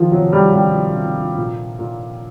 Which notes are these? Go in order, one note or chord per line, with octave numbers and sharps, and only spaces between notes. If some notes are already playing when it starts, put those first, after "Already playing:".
Already playing: D#3 F3
C3 F#3
G3
C3 G3
C3
A#2
A#2